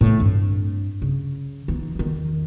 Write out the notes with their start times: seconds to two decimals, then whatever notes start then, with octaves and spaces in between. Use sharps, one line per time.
0.01 A2 D#3
0.20 G2 C4
1.02 C#3
1.68 E3 D#4
1.95 E2 D#3